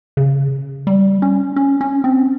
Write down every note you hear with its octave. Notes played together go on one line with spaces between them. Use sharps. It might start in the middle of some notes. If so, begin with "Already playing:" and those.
C#3
G3
C#4
C#4
C#4
C4